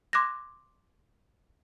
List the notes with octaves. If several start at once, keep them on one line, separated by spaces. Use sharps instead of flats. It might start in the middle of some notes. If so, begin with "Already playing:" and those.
C6 D6 F#6 G#6 A#6